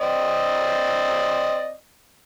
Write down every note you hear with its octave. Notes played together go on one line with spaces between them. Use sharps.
C4 D5 D#5